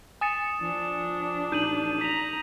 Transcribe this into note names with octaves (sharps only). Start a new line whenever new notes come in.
G#5 D#6 A6 C#7 E7
F3 D4
A1 D#4 G6 D#7 F#7
A#5 B6 F7